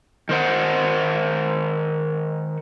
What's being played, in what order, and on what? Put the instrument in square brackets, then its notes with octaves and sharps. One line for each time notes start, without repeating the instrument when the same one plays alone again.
[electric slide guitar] D#3 C5 F#5